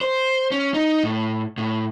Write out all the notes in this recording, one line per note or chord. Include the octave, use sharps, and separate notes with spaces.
C5
C#4
D#4
A2
A2